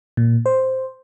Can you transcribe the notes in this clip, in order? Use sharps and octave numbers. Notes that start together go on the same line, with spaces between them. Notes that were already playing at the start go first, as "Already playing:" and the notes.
A#2
C5